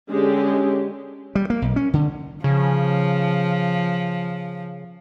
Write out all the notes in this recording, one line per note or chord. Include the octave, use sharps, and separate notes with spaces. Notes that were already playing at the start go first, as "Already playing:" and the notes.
D3 G#3 C#4 G4
G3
A#3
B1
C#4
D3
C#3 F3